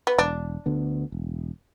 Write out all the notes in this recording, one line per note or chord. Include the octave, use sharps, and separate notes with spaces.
B3
E1 D4
D2 D3 B3
E1